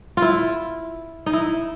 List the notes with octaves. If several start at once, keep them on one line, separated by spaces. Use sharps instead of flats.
E4 F4
D#4
E4